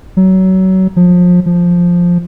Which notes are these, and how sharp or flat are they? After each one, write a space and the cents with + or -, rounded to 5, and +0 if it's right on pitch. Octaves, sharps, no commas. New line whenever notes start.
F#3 +25
F3 +30
F3 +5